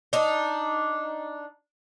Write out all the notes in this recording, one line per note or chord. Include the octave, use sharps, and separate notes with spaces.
D4 D#4